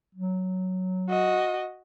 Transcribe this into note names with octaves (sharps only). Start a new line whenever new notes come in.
F#3
F#4 D#5